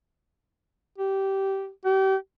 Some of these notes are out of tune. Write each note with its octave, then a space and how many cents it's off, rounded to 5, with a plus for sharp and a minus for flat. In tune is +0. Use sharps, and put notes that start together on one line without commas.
G4 -15
G4 -35